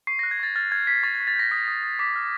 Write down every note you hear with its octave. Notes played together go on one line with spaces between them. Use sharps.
C#6 C7
F#6 A#6
G#6
C#6 A6
F6 A6
F6 G#6
F6 B6
C#6 A6
G#6
C#6
A6
G6 A#6
D#6 B6
D#6
D#6
D6 B6
F6